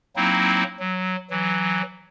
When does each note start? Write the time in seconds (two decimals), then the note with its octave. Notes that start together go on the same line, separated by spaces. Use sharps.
0.16 F#3 A#3 C4 D#4 E4
0.79 F#3
1.31 E3 F#3